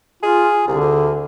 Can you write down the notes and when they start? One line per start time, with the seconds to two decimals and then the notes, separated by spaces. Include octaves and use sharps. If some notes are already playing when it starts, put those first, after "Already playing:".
0.23 F4 G#4
0.68 C2 D3
0.80 D2